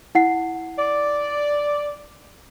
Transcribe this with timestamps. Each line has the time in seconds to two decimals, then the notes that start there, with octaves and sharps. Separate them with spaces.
0.15 E4 F#5 C7
0.79 D5